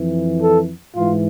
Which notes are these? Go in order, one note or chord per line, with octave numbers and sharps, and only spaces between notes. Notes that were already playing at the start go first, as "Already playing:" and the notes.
Already playing: F2 E3
A4
G#2 E3 F4